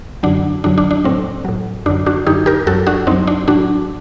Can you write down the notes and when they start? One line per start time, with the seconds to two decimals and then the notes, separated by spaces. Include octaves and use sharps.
0.23 F#2 D3 F#3 D4
0.64 F#2 D3 F#3 D4
0.78 D4
0.91 D4
1.04 A2 F#3 C4
1.45 A2 F#3
1.86 F#2 D3 F#3 D4
2.06 D4 F#4
2.26 F#2 D3 F#3 D#4 G4
2.46 G4 A#4
2.67 F#2 F#3 F#4 A4
2.87 D4 F#4
3.07 F#2 C4 D#4
3.12 F#3
3.27 D4
3.48 A2 F#3 D4 F#4